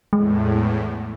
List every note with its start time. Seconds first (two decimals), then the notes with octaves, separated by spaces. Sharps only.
0.13 E2 A2 G#3